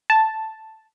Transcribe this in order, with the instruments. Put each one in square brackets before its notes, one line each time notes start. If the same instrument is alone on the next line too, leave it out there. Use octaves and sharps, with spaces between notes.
[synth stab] A5